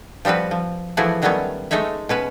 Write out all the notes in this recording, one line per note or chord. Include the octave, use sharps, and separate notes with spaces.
F3 G3 C4 F#4 B4
F3
E3 F3 A3 E4 F#4 G#4
D#3 F#3 G3 A3 B3 C#4
G#3 A3 D#4 C#5 E5
B2 C#4 B4